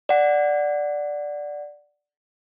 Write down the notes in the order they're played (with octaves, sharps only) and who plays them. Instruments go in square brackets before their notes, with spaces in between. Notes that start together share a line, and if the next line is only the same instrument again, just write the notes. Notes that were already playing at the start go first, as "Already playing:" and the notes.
[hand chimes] D5 F#5